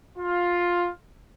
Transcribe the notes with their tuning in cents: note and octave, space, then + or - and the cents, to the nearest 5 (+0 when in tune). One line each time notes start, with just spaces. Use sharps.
F4 +10